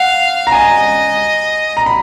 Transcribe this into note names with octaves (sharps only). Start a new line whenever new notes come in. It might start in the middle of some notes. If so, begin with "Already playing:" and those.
Already playing: F5 F#5
A#5
D#5 G#5
A#5
B5